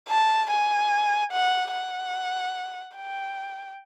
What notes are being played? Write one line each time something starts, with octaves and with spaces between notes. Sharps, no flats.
A5
G#5
F#5
F#5
G5